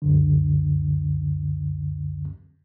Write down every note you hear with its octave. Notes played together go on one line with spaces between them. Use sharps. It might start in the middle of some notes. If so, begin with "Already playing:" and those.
C#2 F#2 D3